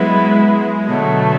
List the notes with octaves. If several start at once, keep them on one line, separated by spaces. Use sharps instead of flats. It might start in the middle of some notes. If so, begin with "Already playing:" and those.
Already playing: F#3 G#3 B3 E4
B2 D3 F#3 A3